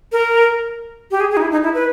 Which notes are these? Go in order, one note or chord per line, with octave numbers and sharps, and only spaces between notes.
A#4
G4
G#4
G#4
D#4
E4
D#4
E4
B4